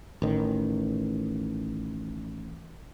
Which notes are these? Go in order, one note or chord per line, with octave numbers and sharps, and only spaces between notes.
A1 D#3